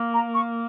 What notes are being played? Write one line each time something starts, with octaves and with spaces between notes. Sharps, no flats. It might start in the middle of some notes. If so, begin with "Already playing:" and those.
Already playing: A#3
A#5
C#6